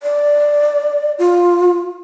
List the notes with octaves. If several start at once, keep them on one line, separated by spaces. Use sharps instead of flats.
D5
F4